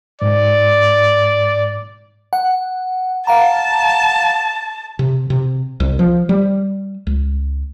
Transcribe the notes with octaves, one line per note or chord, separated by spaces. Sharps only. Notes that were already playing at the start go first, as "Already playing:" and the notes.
G#2 D5
F#5
F5 F#5 A5 A#5
C3
C3
C2
F3
G3
C#2